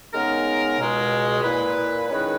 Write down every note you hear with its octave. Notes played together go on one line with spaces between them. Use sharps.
C#3 G#3 B3 D#4 A#4
C#2 B2 G#3
A#2 A#3 E4 B4
D#3 G#3 C#4 E4 B4